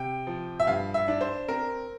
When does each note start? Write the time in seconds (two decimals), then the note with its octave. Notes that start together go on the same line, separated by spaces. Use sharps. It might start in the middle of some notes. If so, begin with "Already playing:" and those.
Already playing: C3 G5
0.27 F3
0.60 E5
0.67 G2 F5
0.94 E5
1.08 D4
1.21 C5
1.48 C4 A#4